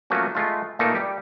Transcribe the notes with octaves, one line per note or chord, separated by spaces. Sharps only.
F3 F#3 A3 A#3 C#4 F#4
G#3 A3 F4
A#2 E3 A3 A#3 D#4 A4
G3 G4